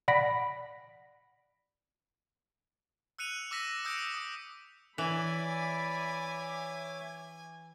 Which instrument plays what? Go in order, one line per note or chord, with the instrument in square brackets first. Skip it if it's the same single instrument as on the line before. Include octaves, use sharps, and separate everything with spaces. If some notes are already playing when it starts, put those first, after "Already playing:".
[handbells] D5 F#5 B5 A#6 B6 D7
[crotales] E6 F#6 C#7 D#7 F7
D6 E6 A#6 B6 E7
D#6 E6 G6 A#6 C#7 D7
D#6
[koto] E3 [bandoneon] C#5 E5 D6 [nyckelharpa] D5 B5 [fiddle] G#5